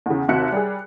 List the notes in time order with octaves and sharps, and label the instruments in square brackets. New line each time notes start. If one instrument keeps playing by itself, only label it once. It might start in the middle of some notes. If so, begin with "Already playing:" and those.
[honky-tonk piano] E2 C#3
D#2 C3 F#4 E5 F#6 C#7
G3 G#4